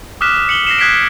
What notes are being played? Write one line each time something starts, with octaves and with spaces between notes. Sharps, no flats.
D6 D#6 F6 F#6 B6 E7
B6 C#7 F#7 G7
A#6 C7 E7
D#6 F#6 G#6 B6 C7 D7